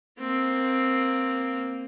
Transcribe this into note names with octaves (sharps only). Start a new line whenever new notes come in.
A#3 C4